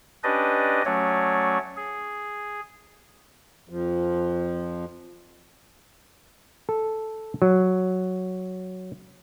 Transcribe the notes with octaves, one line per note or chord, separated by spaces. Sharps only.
C#4 D4 G4 B4 D5 D#5
F#3 A3 C#4 C#5 D5
G#4
F2 F3
A4
F#3